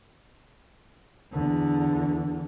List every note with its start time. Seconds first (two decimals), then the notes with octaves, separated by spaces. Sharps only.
1.32 E2 D3